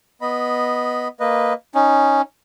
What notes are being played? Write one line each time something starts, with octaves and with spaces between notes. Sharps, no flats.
B3 D#5 B5
A#3 B4 D#5
C#4 D#4